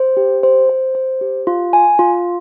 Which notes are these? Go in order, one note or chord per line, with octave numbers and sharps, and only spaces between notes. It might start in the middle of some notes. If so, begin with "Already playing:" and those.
Already playing: C5
G4
C5
C5
C5
G4
F4
G#5
F4